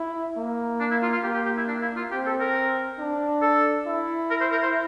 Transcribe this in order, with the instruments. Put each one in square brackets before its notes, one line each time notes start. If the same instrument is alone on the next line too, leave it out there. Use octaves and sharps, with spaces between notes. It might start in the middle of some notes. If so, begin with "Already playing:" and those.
Already playing: [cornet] E4
A#3
[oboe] D4
E4
F4
F4
[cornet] A#3 [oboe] G4
[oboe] G4
G4
E4
D4
E4
F4
[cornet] C4 [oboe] G4
[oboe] A4
A#4
[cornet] D4
[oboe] A4
[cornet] E4
[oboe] A#4
C5
A#4
C5